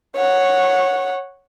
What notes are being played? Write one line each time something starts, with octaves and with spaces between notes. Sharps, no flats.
C#5 F#5